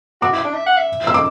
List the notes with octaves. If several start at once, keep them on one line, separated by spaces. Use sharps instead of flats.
F#4 D6
E4
D4
E5
F#5
E5
E6
D6